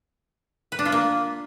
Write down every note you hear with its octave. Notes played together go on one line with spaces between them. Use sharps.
B4
D4
F4
A#3